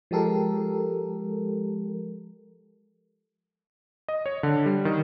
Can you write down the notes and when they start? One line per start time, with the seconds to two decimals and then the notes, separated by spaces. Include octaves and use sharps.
0.11 F3 G#3 G4 A4 A#4
4.08 D#5
4.26 C#5
4.43 D3
4.66 G3
4.85 D#3